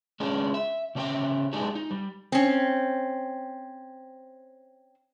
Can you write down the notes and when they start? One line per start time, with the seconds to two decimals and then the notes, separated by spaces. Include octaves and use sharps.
0.20 G#3 C#4 D4 G#4
0.54 E5
0.95 C#3 C#4 D4 G4 E5 G5
1.53 G#3 D4 D#4 G4 G#4
1.75 D#4
1.91 G3
2.32 C4 C#4